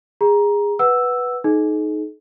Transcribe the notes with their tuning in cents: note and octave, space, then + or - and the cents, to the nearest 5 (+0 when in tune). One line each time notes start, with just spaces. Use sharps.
G#4 -20 A#5 +15
B4 +0 F#5 +0 E6 +0
D#4 +0 G#4 +45